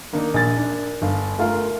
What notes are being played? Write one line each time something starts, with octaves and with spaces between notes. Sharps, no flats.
D#3 A#3 D4 D#4
A#1 A6
D4 A#4
G1 F5
A3 F4 A#4 F5